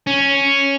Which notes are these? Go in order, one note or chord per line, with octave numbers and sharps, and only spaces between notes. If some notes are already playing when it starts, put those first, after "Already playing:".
C#4